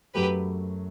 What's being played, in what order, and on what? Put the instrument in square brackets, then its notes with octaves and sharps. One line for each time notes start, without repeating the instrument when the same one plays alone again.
[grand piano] F#2 F#3 A3 [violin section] G4 B4